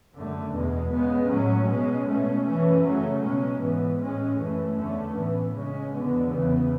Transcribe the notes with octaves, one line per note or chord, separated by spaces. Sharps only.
F#2 D3 A3
E2 B2 G#3
C#3 G#3 B3
A2 F#3 C#4
B2 G#3 C#4
B2 A3 C#4
F#2 E3 A3 C#4
C#3 F#3 A3 C#4
B2 G#3 C#4
G#2 E3 B3
A2 G#3 C#4
F#2 E3 A3 C#4
E2 D3 A3 C#4
A2 E3 B3
C#3 G#3 C#4
E2 D3 G#3 B3
E2 C#3 E3 B3